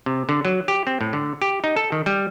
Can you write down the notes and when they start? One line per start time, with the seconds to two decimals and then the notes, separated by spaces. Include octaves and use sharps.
0.06 C3
0.29 D3
0.45 F#3
0.68 G4
0.87 C4
1.01 A2
1.13 D3
1.42 G4
1.64 D#4
1.76 A4
1.92 D#3
2.06 G3